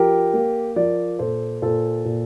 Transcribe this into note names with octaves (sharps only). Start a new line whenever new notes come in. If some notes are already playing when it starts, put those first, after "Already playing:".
Already playing: F3 G4 A#4
A#3
F3 A#4 D5
A#2 A4 C5
A#2 A4 C5
A#2